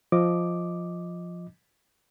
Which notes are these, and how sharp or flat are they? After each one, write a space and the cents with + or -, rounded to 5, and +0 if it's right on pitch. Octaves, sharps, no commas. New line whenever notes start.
F3 +0 D#5 +0 D6 +0